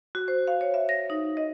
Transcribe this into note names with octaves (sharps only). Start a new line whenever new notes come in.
F#4
C5
F5
C#5
E5
A#6
D#4
D#5